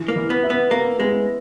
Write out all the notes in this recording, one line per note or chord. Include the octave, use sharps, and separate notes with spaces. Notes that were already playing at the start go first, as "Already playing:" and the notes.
Already playing: E3
A#3
E3
B3
E4
B3
A#3 B3
G#3 B3